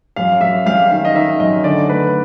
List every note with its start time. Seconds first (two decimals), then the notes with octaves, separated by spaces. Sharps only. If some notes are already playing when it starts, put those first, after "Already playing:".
0.16 F#2 F5
0.41 F#2 E5
0.66 G3 F5
0.90 D#3 F5
1.05 D#5
1.14 D#3 E5
1.40 F#2 D#5
1.64 D3 D5
1.88 A3 B4